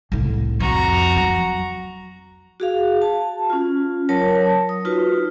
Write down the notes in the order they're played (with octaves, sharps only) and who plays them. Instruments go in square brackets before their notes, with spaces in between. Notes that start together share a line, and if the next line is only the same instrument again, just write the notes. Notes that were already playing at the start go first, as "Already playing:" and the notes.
[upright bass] C2 A2
[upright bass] F2 [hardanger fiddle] F#4 A#5
[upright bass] F#3
[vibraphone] F#4 G#4 F5
A5
C#4 F4
F#3 A#4 C#5 A5
D#6
D#4 F4 F#4 B4